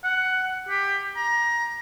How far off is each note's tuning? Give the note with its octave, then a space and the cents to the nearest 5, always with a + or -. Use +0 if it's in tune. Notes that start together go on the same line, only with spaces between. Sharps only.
F#5 +10
G4 +20
A#5 +20